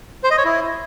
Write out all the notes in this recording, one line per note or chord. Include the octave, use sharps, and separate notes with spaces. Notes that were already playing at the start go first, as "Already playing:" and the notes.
C5
D#5
C#5
E4